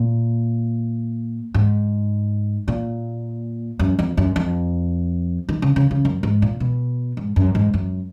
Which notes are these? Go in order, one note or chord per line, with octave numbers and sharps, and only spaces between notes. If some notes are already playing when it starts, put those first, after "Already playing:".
Already playing: A#2
G#2
A#2
F#2
F2
F#2
F2
D#3
C#3
C#3
C#3
F#2
G#2
A#2
B2
G#2
F#2
G#2
F#2